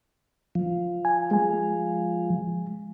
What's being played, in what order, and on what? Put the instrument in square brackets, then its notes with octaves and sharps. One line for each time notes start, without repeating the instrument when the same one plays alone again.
[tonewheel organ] F3
[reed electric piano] G#5
G#3 G#5